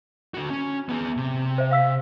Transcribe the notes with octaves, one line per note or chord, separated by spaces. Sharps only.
D3 F#4
C#4
B3 G#4
C3
C5 E5
F5 E6 B6